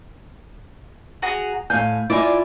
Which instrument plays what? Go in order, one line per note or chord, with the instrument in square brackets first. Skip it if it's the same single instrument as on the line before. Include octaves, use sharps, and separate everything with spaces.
[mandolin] F#4 G#4 A#5
[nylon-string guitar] A2 F5 G#5 [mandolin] G6
[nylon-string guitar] E4 F4 D#5 [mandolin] D5 G#5